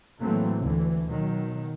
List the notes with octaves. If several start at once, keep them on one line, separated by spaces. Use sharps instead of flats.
A2 E3 F#3 A3 A#3 C4
D2 E3
B2 D#3 F#3